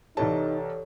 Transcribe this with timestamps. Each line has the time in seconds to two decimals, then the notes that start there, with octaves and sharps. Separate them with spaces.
0.17 C2 E3 D#4 G4 A4 C#5 A5